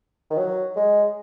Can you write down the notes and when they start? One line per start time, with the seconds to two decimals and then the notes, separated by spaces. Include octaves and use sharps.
0.31 D#3
0.38 F#3
0.76 G#3